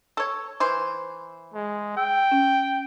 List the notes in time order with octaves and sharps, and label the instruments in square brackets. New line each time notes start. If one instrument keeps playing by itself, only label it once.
[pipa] A4 C#5
E3 C5
[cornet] G#3
[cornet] G5 [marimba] E6
[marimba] C#4